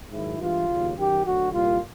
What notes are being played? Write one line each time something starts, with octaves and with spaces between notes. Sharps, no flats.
G#2 D#3 F#3 E4
G2 E3 G#3 F4
D#2 C#3 F#3
F#2 D#3 F#3 G4
D2 D3 F#3 F#4
C2 A#2 G3 F4